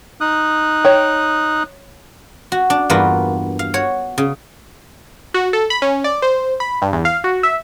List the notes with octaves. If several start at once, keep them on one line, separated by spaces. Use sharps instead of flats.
D#4 D#6 F#6
C#5 G5
F#4
D4
E2 G2 A#3 F4 F#4 B4
F5
F#4 C#5
C#3
F#4
A4
B5
C#4
D5
C5
B5
G2
E2
F5
F#4
E5